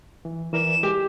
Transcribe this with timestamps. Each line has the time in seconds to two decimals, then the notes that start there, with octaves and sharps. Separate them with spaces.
0.25 E3
0.53 E3 A#4 D5 E7
0.83 G#3 G4